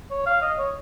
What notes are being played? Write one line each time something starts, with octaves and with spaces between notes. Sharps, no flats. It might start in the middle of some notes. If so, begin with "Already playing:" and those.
C#5
F5
D#5
C#5